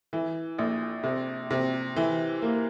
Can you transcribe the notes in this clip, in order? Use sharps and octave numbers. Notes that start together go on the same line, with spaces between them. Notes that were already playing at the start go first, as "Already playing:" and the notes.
E3
A#1
C3
C3
E3
A#3